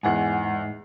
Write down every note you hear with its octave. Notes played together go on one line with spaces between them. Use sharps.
E2 G#2 F#5 G#5